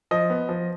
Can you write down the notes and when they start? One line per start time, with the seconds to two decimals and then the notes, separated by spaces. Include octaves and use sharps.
0.11 F3 D#5
0.30 B3
0.49 F3